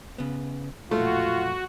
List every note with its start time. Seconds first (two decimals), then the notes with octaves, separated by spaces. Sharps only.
0.18 C#3 B3
0.91 B1 F2 A#2 A3 F4 F#4